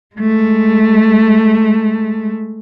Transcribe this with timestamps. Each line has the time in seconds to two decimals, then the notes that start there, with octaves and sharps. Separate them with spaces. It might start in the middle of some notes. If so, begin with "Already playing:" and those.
0.16 G#3 A3